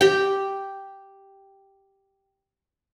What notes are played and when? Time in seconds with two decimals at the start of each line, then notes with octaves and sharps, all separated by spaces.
0.01 G4 G5